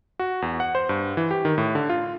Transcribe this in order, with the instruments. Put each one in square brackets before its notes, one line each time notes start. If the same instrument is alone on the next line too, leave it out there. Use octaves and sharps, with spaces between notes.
[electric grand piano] F#4
E2
F#5
C5
G2
E3
G4
D#3
A2
D3
F4